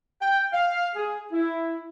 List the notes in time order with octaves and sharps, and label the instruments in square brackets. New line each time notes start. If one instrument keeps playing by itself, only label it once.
[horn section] G5
F5
G#4
E4